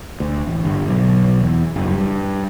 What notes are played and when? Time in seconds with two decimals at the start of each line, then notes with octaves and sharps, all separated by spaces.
0.20 D2
0.47 A1
0.65 G1
0.88 B1
1.41 E2
1.76 F#1
1.90 G2